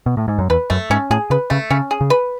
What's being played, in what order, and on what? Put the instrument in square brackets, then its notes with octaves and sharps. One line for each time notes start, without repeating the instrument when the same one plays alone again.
[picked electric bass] B2
A2
G#2
F#2
[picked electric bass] E2 [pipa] B4
[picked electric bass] F#2 [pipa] A3
[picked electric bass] G#2 [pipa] C#4
[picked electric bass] A2 [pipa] G#4
[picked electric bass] C#3 [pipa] B4
[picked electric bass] C#3 [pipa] A3
[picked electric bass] C#3 [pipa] C#4
[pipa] G#4
[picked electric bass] C#3
[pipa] B4